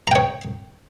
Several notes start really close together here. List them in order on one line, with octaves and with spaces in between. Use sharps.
A#5 G5 C#5